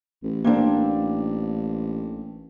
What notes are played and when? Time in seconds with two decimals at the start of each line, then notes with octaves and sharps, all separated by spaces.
0.24 A1
0.44 A#3 C4 D4